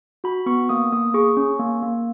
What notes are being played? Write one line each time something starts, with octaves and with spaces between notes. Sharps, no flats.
F#4 B5
B3 C#6
A#3 D#6
A#3 D#6
G#4 C#6
C#4
A#3
A#3